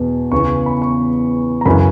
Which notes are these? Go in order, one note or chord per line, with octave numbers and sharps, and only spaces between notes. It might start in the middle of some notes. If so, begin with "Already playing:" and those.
Already playing: E2 B2
E2 C#3 E3 C#6
B5
C#6
A#5
F#2 C#3 E3 B5